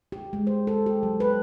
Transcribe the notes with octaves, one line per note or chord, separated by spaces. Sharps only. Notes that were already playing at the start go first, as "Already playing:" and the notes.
G4
G#3
C5
A4
G4
F#3
B4